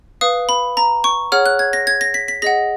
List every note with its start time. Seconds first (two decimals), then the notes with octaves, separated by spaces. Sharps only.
0.21 B4 F5 D#6
0.49 B5
0.77 A#5
1.04 C#6
1.32 G#4 C#5 F#5 F6
1.46 F#6
1.59 G#6
1.73 A#6
1.87 G#6
2.01 A#6
2.14 B6
2.28 B6
2.42 G#4 D#5 F#5 A#6